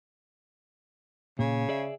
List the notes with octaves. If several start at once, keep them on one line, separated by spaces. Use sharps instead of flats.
A#2 C#3
G#4 D5 E5